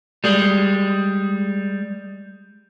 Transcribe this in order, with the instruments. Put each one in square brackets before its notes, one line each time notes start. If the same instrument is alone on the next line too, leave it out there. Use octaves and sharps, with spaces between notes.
[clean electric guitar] G3 G#3